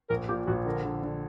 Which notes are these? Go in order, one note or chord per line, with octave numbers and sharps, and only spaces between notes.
A#1 A#4
A#2 G4
A#1 F#4
D3 A#4
D3
D3